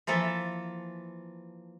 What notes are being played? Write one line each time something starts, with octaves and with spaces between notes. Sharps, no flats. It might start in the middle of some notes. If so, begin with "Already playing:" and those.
E3 F3 A#3 A4 E5